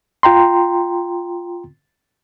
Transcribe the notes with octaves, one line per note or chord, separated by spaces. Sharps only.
F4 G5 A#5 C6